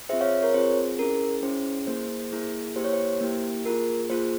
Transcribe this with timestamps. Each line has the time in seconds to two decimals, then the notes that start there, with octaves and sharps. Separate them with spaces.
0.09 C4 F4 G#4 C5 E5
0.21 C#5 F5
0.43 A#4 C#5
0.54 C4 F4 G#4 C5
0.99 C#4 E4 G#4 A#4
1.43 C#4 E4 G#4 C5
1.87 A#3 E4 G#4 C5
2.32 A#3 E4 G#4
2.76 A#3 E4 G4 C5
2.84 C#5
2.93 C5
3.21 A#3 E4 G4
3.64 A#3 F4 G#4 A#4
4.10 A#3 F4 G#4 C5